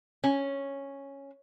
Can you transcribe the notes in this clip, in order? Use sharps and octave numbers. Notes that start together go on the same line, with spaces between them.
C#4